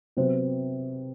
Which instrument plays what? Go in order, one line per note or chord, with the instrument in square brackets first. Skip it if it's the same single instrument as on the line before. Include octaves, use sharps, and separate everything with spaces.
[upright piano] C3 F#3 B3 [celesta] C5